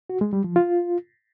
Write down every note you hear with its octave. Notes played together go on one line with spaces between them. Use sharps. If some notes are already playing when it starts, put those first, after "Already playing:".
F#4
G#3
G3
F3
F4